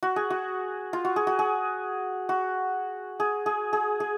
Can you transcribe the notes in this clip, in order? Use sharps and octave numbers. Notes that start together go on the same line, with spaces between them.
F#4
G#4
F#4
F4
F#4
G#4
F#4
G#4
F#4
G#4
G#4
G#4
G#4